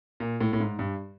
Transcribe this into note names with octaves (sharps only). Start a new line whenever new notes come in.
A#2
A2
A2
G#2
G2